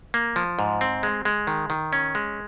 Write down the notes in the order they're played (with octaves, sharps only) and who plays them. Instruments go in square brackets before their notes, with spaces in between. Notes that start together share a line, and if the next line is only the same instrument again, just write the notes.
[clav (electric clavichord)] A#3
F3
G#2
C4
G#3
G#3
D#3
D#3
C#4
G#3